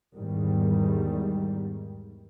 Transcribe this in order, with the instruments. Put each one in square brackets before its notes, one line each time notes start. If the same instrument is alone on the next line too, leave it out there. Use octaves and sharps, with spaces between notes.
[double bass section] E2 G#2 D#3 G3